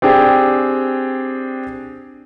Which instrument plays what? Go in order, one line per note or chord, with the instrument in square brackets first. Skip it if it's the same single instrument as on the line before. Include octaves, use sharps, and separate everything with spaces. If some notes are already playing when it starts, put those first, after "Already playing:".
[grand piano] C4 D4 G4 G#4